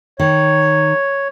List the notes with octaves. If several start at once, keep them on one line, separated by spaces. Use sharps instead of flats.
D#3 C#5